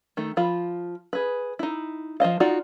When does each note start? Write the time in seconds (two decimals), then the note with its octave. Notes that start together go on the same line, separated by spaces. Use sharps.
0.17 D#3 A3
0.37 F3 F4 B5
1.13 G#4 B4
1.59 D#4 E4
2.20 F3 C5 D#5 F5
2.40 D#4 F4 F#4 D5